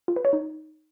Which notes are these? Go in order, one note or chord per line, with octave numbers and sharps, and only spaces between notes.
F4
B4
C#5
D#4